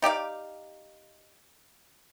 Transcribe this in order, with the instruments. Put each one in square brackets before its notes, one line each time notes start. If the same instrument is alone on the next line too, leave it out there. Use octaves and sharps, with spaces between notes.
[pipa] D#4 G4 D5 F5